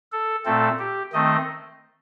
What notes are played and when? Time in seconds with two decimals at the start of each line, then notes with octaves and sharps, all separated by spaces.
0.12 A4
0.45 A#2 A3 C4 A4
0.79 G4
1.13 D#3 A3 C4 D#5